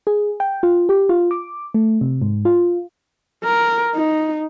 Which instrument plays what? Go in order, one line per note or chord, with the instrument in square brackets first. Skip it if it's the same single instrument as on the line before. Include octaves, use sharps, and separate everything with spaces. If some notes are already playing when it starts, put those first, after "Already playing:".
[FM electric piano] G#4
G5
F4
G4
F4
D6
A3
C3
G#2
F4
[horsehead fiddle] A#4
D#4